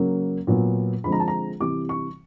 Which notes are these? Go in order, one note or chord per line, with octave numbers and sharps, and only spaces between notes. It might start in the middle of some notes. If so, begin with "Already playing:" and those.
Already playing: C#3 F#3 A#3
A#2 F#3 B3
D3 F3 G#3 C4 B5
A#5
A5
A#5
C3 E3 G3 D6
C#6